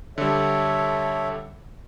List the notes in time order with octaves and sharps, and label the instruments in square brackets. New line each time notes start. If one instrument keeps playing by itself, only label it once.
[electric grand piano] D3 G3 [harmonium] A4 C#5 E5